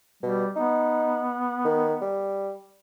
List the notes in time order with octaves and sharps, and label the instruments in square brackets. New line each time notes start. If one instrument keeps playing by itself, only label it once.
[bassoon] B2 [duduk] G3
[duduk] B3 [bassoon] D#4
[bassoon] D#3
G3